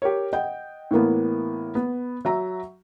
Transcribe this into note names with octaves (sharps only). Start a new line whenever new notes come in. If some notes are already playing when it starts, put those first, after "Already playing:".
G4 A#4 C#5
D#5 F#5 G5 G6
A2 E3 A#3 B3
B3
F#3 E5 A#5